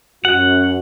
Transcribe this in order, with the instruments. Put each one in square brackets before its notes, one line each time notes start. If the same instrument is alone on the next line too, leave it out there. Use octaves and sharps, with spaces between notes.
[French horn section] F#2 F#4 [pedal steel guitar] F#5